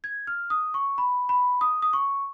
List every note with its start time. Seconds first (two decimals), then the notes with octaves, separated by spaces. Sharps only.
0.04 G#6
0.27 F6
0.50 D#6
0.74 C#6
0.98 B5
1.29 B5
1.61 D#6
1.82 D#6
1.93 C#6